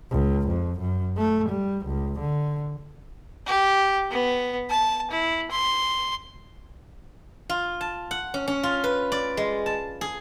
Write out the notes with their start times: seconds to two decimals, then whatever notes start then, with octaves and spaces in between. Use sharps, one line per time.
0.11 C#2
0.48 F2
0.79 F#2
1.18 A3
1.49 G3
1.86 C#2
2.20 D3
3.47 G4
4.11 B3
4.70 A5
5.11 E4
5.51 C6
7.50 F4
7.81 A5
8.11 F#5
8.34 C#4
8.48 C#4
8.63 F4
8.84 B4
9.12 D5
9.37 G#3
9.66 A5
10.01 G#4